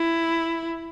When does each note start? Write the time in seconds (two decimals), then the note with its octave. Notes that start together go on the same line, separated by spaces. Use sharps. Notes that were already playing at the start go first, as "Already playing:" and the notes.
Already playing: E4